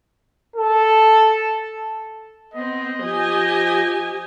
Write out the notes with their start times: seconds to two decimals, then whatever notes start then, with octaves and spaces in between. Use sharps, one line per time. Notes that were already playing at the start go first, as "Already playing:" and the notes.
0.56 A4
2.54 B3 C4 D#5
3.02 F3 G4 G#5